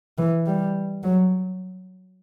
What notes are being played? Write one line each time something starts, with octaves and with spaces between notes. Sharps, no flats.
E3
G3
F#3